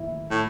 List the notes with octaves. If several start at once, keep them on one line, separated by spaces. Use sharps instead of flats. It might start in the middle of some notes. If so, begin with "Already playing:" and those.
Already playing: E4
A2